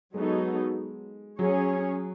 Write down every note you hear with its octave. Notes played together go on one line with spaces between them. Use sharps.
F#3 G#3 B3 D#4 A4
F#3 C#4 G#4 C#5